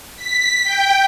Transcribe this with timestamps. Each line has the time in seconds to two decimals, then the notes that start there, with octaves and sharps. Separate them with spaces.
0.17 B6
0.64 G5